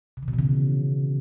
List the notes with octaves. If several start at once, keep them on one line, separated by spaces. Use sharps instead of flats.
C3
D#3
B2
E3
C#3